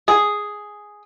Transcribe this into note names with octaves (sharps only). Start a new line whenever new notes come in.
G#4